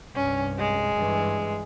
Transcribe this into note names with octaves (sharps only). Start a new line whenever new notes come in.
C2 G2 C#4
G#3
G2 E3